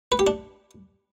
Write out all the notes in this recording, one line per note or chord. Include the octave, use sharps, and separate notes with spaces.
B4
G4
D4